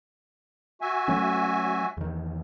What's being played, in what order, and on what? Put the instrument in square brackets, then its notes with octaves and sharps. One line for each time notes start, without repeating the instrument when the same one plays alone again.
[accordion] F#4 E5 G#5
[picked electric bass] F#3 A3 C#4
E2 D#3